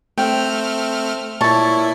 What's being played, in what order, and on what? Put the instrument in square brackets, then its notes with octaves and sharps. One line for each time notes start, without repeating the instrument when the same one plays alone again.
[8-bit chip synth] A3 C4 F6 [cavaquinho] G5
[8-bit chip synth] A#2 E4 [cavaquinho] C#5 A5